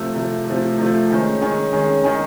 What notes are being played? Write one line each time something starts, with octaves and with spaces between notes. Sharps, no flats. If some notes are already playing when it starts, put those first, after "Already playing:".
Already playing: C3 F3 A3
C3 F3 A3
C3 F3 A3
C3 F3 A3
D#3 G#3 C#4
D#3 G#3 C#4
D#3 G#3 C#4
D#3 G#3 C#4